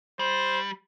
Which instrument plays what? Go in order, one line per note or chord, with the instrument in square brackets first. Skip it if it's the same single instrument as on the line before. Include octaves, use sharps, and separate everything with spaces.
[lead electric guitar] G3 [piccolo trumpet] C5